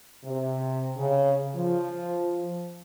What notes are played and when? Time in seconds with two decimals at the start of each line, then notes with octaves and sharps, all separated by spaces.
0.25 C3
0.97 C#3
1.56 F3